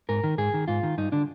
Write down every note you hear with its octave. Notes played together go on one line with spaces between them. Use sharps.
G#2 A#4
D#3
G#2 G#4
D#3
G#2 F4
D#3
G2 D#4
D3 D4